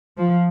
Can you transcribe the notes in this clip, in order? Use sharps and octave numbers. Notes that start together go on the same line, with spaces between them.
F3